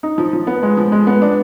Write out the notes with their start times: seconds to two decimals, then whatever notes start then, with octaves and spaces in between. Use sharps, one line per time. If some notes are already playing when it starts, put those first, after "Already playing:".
0.03 D#4
0.18 F3
0.33 F3
0.47 B3
0.63 G#3
0.77 F3
0.92 G#3
1.07 B3
1.22 D4